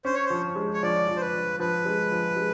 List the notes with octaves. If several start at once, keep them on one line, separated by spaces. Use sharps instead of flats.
C#4 C5
C#5
C5
F3
G#3
C#5
F3 D5
F3
C5
B4
F3
F3 B4
G#3
F3
G#3